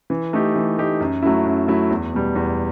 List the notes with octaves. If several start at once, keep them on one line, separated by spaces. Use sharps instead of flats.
E3
A3 D#4 G4
E3
A3 D#4 G4
F#2
F#3 A3 E4
F#2
F#3 A3 E4
E2
B2 G3
E2